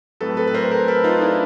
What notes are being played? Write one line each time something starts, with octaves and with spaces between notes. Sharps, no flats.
A2 F#3 A3 C4 A4 B4
A4 B4
B4
A#4 C5
A#4 C5
A4 B4
D#4 F4
D4 E4